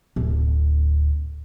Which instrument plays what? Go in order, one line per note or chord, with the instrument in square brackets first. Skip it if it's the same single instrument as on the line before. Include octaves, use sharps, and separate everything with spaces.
[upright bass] D1